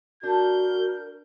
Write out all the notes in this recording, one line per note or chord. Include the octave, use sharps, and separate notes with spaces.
D4 F#4 A#4 G6